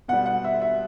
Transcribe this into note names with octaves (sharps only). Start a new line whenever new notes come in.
B2 G3 F#5
F#5
E5
E5